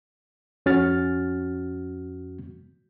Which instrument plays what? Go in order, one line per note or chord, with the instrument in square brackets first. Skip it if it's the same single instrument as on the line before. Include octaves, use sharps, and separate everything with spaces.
[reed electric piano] F2 C#4 F#4 F6 A6